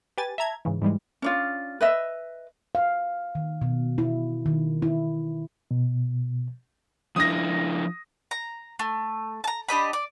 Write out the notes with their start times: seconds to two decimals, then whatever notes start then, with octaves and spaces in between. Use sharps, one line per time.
0.18 G4 B4 G#5 A6
0.38 E5 A5 A#5 G#6
0.65 G#2 C#3 E3
0.82 G#2 E3 G3 G#3
1.22 C#4 D4 F4
1.81 B4 D#5 E5
2.75 F5
3.35 D#3
3.62 B2
3.98 E4
4.46 D#3
4.82 E4
5.71 B2
7.16 F3 D4 E4 D#6 A#6
8.31 A#5
8.79 A3
9.44 A5 A#5
9.69 D4 G4 D#5 B5
9.93 D5